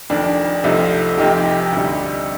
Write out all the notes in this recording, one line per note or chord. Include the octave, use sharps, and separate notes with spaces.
F1 F2 D#3 D4
C2 C3 F3 A3 D#4
F1 F2 C3 D#4 G4
D#4 G4
D2 C3 G3